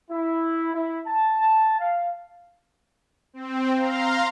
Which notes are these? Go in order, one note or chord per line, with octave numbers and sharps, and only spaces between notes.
E4
E4
A5
F5
C4
F5 A#5 C6